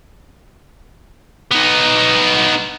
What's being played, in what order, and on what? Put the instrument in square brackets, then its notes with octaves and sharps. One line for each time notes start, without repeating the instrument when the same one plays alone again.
[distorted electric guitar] B3 D#4